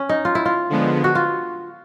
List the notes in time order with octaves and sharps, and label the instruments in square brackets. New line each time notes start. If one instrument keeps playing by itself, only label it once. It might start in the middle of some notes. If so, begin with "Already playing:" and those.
Already playing: [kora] C#4
D#4
F4
E4
F4
[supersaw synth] D3 F3 G#3 B3
[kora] F#4
F4